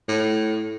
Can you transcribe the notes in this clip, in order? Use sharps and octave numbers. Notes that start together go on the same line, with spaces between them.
A2